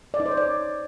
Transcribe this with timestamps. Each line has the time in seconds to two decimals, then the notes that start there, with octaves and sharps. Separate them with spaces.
0.14 D5
0.20 D#4
0.26 C5
0.31 C#5
0.37 D5